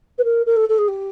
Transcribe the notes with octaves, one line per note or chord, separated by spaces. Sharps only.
B4
A#4
A#4
A4
A4
G#4
G4